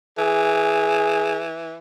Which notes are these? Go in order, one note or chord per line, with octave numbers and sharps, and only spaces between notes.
E3 G#4